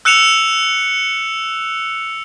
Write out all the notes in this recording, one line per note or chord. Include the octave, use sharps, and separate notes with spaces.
E6 F#6 C#7 E7 F7